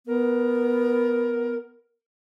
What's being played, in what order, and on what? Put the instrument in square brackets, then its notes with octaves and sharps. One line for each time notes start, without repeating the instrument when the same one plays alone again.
[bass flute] B3 [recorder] A#4